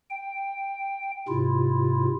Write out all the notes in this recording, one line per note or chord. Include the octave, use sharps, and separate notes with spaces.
G5
G#2 C3 E4 F4